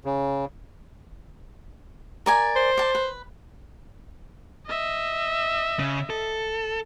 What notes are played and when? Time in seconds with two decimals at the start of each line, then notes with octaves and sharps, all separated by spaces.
0.05 C#3
2.26 A#4 D5 G#5
2.56 C5
2.77 D5 A5
2.95 B4
4.67 D#5 E5
5.79 C#3
6.10 A4